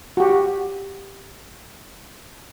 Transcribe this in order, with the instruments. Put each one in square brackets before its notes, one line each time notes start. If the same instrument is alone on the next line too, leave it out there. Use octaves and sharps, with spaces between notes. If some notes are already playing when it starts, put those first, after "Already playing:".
[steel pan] F#4 G4